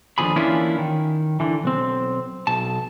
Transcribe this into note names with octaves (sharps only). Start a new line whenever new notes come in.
D#2 D3 F3 G#4 B5
E3 A#3 C#4 D4 E4 F4
D#3
D3 E3
B1 C4
B1 A5